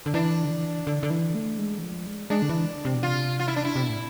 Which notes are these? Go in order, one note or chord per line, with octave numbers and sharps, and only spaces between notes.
D3
E3 D4
D3
E3
D3
D3
E3
A3
G#3
E3
F3
G#3
G#3 D4
D3
E3
C3
B2
C3 F4
F4
E4
D4
E4
C3
B2
A2